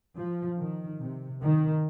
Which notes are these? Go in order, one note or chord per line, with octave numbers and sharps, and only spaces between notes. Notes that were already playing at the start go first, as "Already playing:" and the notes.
F3
D#3
C3
D#3